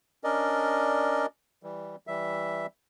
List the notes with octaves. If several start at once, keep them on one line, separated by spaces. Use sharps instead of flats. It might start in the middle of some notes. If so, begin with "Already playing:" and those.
C#4 D4 A#4 D5 D#5
E3 G3
E3 G3 E5